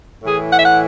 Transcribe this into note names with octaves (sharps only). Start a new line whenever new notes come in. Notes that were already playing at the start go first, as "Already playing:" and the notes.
A2 E3 G#4
F#5
E5
F#5